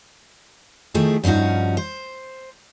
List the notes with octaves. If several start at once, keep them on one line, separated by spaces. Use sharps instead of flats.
D#3 F3 A3 E4 G#4
G2 F3 C#4 D#4 F#4
C5